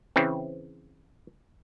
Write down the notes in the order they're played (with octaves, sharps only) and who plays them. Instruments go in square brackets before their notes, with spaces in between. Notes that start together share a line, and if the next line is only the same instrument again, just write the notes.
[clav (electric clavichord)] C#3 E3 C4